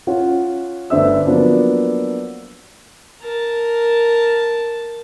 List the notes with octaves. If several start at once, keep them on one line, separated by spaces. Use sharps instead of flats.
C#4 F4 F#5
G1 D2 D4 C5 E5 E6
F3 F#3 A#3 B3 D4
A#4 A5